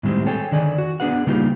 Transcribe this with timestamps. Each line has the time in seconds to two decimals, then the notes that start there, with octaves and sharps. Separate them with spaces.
0.03 A2 D#3 G3 G#3 C4 G4
0.26 G#4 A4 C#5 G5 G#5
0.51 D3 D#3 D5 G#5
0.78 F#4
1.00 B3 D4 G#4 B4 F#5
1.27 C#3 G3 A#3 D#4 F4 G4